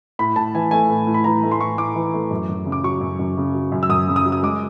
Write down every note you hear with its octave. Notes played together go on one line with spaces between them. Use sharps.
A2 B5
A2 A5
E3 G#5
A3 G#5
A2
A2
B5
E3 A#5
A3
C6
A2 C#6
A2 D6
E3
A3
F#2
F#2
C#3
D6
F#3 C#6
F#2
F#2
C#3
F#3
F#2
E6
F#2 D#6
C#3
D#6
F#3
D#6
G#3 D6